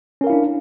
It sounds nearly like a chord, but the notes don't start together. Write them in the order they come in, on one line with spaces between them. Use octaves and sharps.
C#4 A#4 F5 E4 D4